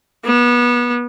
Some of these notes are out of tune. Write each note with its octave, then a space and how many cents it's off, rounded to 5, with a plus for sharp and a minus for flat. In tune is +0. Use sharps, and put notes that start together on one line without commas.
B3 -30